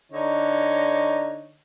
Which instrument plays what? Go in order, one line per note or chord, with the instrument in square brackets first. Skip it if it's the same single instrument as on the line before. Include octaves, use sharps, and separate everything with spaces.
[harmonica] D3 D#4 C#5